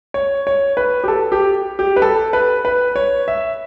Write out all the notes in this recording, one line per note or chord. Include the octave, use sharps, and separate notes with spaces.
C#5
C#5
B4
G4
A4
G4
G4
B4
A4
B4
B4
C#5
E5